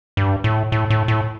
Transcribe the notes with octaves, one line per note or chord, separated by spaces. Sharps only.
G2
A2
A2
A2
A2